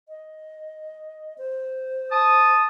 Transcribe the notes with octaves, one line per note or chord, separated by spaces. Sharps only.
D#5
C5
A5 D#6